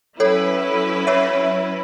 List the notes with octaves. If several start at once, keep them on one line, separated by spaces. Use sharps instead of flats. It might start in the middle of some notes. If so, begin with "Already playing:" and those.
F#3 C#4 E4 A4 B4 C#5
C#5 E5